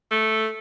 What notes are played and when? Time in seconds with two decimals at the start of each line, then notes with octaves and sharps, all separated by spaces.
0.11 A3